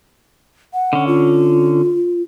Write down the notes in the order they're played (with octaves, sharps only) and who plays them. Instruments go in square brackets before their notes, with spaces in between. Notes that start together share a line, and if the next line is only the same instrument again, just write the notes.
[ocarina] F#5
[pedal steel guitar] D3 C#4
[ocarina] F4